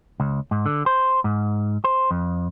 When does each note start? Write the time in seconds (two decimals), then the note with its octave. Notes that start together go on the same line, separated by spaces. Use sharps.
0.20 C#2
0.51 G#2
0.66 D3
0.86 C5
1.24 G#2
1.84 C5
2.11 F2